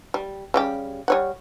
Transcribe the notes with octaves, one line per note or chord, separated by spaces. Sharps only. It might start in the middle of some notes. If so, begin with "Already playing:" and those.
G3
C#3 G3 G4
G3 C#5 F#5